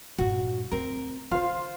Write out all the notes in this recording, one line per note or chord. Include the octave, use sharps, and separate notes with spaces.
G2 A#2 F#4
D2 C4 A#4
D3 F4 C5 F5